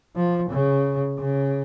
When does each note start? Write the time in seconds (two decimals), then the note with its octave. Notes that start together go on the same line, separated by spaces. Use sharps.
0.16 F3
0.51 C#3
1.19 C#3